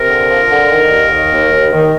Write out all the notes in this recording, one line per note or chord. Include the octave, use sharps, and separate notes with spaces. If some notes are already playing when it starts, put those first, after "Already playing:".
Already playing: C3 A#4
D3
F3
D3
D#3
D#2
D#3
D#2
D#2
D#3